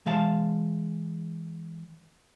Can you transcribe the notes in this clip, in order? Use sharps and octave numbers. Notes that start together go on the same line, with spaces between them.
E3 G#3 F5 A5